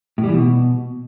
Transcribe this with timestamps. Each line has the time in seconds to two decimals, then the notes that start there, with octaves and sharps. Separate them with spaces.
0.18 A2
0.23 G3
0.29 E3
0.34 B2